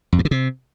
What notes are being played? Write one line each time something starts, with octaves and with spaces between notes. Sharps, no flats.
F2
G2
D3
C3